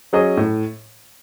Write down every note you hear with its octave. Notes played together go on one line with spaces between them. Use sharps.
F#3 C#4 G#4 D#5
A2